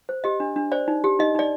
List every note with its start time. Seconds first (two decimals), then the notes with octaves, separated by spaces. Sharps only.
0.09 C5
0.24 G4 D#5
0.40 D4
0.56 D4
0.72 C5 D5
0.88 D#4
1.04 G4
1.19 D#4 D#5
1.35 D#4 D5